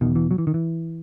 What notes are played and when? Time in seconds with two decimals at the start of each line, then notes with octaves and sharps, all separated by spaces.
0.01 E2 B2 D#3
0.15 E3
0.31 F#3
0.38 E3
0.47 D#3
0.54 E3